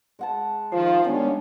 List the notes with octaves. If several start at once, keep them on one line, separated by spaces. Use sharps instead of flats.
G#3 F#5 A5
D#3 F3 F5
D#3 G3 G#3 B3 C#4 D4